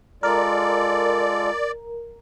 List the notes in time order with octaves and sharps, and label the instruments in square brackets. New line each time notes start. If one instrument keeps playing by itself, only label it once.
[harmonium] G#3 F4 A4 [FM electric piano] A#4 [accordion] D5